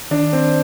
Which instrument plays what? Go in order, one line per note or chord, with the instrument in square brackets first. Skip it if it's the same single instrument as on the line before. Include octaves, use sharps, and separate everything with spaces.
[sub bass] D#3 [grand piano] D4
[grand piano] C4